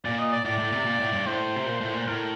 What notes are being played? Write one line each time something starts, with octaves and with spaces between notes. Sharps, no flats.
A#2 D5
D#5
D5
A2 D5
A2
C3
A#2
A2
G2
A2 C5
C3
A#2
A2
A#2
A2 A#4